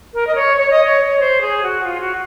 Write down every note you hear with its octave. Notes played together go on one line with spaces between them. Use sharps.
A#4
D#5
C#5
C#5
D#5
C#5
C5
G#4
F#4
F4
F#4